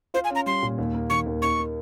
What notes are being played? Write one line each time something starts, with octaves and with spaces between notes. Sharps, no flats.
F4 C5
G#5
C#4
A#5
G3 C6
A#2
D#2
A#3
D#3 C#6
D#2
D#4 C#6
A#3